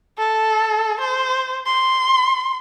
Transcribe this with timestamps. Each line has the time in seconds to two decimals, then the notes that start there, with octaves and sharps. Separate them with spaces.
0.18 A4
1.01 C5
1.66 C6